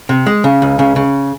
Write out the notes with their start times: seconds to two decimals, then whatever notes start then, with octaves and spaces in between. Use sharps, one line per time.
0.09 C3
0.26 G#3
0.44 C#3
0.62 C#2
0.79 C#3
0.96 C#3